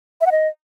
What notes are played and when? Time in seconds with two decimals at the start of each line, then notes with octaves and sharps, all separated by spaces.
0.21 E5
0.26 F#5
0.32 D#5